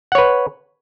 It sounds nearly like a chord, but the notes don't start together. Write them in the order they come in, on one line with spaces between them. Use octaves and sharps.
F#5 C#5 B4